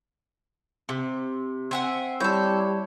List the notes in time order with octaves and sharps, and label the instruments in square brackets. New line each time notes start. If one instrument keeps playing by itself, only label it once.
[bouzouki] C3
[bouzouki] C4 [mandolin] E5 F#5 G#5
[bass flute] G3 [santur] E4 C#5 [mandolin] A4 G6